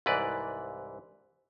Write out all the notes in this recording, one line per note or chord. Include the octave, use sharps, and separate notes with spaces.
C2 G#2 E3 B4 D5